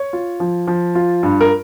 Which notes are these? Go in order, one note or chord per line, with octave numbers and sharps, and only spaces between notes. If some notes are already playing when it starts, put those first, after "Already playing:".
Already playing: C#5
F4
F3
F3
F4
G2
A#4